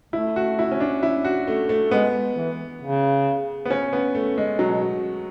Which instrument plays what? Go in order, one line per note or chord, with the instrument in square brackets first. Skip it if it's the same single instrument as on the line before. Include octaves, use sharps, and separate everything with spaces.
[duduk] A3 [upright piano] E4
[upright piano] F#4
E4
C#4
D4
E4
F#4
A3
A3
[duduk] G#3 [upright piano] B3
[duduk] E3
C#3
[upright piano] B3
C#4
B3
A3
G#3
[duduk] B2 [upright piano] F#3